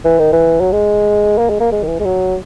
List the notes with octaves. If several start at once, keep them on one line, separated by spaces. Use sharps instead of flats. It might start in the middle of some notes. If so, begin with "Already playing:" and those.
E3
D#3
E3
F#3
G#3
A#3
G#3
A#3
G#3
D#3
E3
G#3
F#3